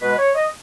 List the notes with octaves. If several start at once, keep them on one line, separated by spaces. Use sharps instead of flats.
B2 G#3 B4
C#5
D#5